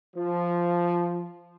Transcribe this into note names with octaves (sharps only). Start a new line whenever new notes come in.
F3